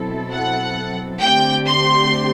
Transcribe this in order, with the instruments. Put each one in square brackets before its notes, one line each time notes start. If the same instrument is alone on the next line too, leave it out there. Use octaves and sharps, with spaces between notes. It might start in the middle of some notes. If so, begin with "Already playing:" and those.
Already playing: [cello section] B2 F#3 C4 E4 A4
[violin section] F#5
[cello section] D3 A3 C4 G4 [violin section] G5
[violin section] C6